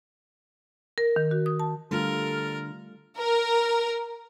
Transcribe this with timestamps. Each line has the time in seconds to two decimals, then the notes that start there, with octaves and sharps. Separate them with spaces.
0.98 A#4
1.16 D#3
1.31 F#4
1.46 D#6
1.60 A5
1.91 D3 G3 A3 F4 A4 A#4 F6
3.18 A#4